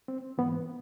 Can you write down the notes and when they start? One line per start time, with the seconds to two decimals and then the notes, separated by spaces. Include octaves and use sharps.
0.08 C4
0.38 G#2 E3 B3